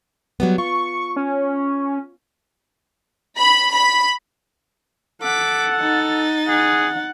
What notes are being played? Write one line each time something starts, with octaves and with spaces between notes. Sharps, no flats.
F#3 G3 B3
F4 C#6
C#4
B5
B5
A4 F#5 D6 B6
D#4 A6
G#4 F#5